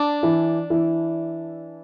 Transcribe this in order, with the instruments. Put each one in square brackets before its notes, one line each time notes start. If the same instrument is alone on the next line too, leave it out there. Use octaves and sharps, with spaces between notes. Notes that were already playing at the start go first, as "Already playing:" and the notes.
Already playing: [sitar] D4
[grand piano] E3 E4
E3 E4